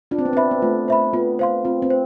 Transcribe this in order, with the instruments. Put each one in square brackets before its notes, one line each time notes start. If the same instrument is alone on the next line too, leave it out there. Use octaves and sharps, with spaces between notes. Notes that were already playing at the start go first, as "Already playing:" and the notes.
[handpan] D4 [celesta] F4
[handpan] C4
B3
[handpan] C4 [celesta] C5 E5 B5
[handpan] B3
[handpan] A3 [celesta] F4
[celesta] C5 E5 B5
[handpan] B3 [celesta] F4
[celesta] C5 F5 C6
[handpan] C4 [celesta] F4
[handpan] C4
[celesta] C5